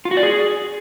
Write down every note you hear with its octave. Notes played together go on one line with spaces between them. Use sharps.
F4
F#4
D5
G#4